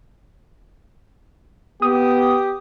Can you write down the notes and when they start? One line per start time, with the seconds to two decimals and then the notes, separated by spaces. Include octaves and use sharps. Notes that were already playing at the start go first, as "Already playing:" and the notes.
1.82 B3 G4 D#6